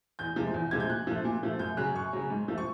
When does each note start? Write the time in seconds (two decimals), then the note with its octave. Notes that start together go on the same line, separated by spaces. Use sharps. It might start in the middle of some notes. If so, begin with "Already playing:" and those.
0.19 E2 G6
0.36 C3 F3 G#3
0.54 E2
0.71 C3 F3 G#3 G#6
0.80 G6
0.90 A#2 F#6
1.07 F3 A3
1.24 A#2
1.43 F3 A3
1.59 F#2 G6
1.77 C#3 F#3 F#6
1.95 F#2 C#6
2.13 C#3 F#3
2.30 G#2
2.48 F3 A3
2.58 C#6